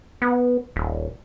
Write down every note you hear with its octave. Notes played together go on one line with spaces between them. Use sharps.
B3
D#1